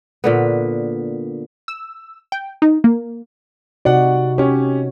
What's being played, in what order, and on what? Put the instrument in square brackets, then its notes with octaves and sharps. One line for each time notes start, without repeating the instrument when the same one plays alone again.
[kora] A#2 D3 B3
[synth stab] E6
G5
D#4
A#3
[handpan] C3 D#4 F#4 [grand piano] D5 F#5
[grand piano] C#4 G4 [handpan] C#5